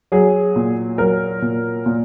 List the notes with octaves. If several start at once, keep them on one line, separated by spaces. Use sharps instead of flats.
F#3 G#4
A#2
F#3 A#4
A#2
A#2